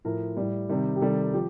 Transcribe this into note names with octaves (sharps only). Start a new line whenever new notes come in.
A2 F3 A#4
A2 G3
C3 D#3 G3
G4
C3 D#3 G3 A4
F3 G4